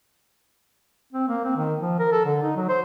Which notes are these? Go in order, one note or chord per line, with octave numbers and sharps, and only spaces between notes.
C4
A#3
C4
D#3
F3
A#4
A4
D3
D#4
F#3
C5